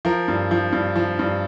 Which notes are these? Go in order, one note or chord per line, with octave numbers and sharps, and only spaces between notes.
F3 A#4
G2
F3
G2
F3
G2